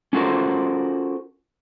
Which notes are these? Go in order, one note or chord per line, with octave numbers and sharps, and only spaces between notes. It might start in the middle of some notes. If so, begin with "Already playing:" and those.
C#4 F4 F#4 A4 A#4 C5